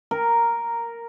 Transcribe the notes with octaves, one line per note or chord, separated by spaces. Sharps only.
A#4